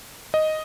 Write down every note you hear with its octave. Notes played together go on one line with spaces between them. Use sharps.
D#5